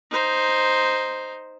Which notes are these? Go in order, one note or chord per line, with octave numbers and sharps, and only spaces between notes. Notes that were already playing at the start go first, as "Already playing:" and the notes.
D#4 C5